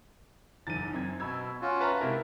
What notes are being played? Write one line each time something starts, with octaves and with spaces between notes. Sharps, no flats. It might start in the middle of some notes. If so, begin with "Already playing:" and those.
F#1 B1 E2 A6 D#7
F#2 C4 G#6
B2 B5 E6 G#6
C#4 F4 F#4
B4 E5 F5 A5 A#5
G#2 C3 E4 A#4